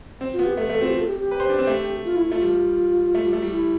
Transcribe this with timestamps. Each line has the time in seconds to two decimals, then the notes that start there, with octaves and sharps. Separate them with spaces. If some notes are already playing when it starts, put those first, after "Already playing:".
0.21 C4
0.33 F4
0.39 B3
0.45 G4
0.57 A3 A4
0.69 A3 A4
0.81 C4 F4
0.88 G4
0.94 F4
1.01 A4
1.07 G4
1.19 G4
1.31 B4
1.40 C5
1.49 D4
1.59 C4
1.67 A3
2.05 F4
2.16 E4
2.29 A3 F4
2.41 G3
3.15 A3
3.24 G3
3.33 A3
3.42 G3
3.51 E4